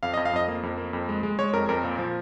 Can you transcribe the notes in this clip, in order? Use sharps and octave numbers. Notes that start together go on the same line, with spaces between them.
F2 F5
D#5
F2
F5
F2 D#5
A#3
F2
A#3
F2
G#3
G#3
G#3 C#5
F2 A#4
F2 A#4
A#2
F3